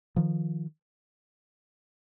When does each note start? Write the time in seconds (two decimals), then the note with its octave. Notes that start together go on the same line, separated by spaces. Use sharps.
0.16 D#3 F3